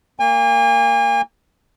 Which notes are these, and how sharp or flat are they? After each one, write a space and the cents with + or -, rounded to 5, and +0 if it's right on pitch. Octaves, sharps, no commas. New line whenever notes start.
A#3 -15 G#5 -40